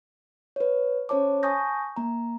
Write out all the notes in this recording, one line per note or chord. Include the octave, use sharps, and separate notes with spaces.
B4 C#5
C#4 C5 C#5 A5 D6
G#5 A5 C#6 D#6 G6 A#6
A#3 A#5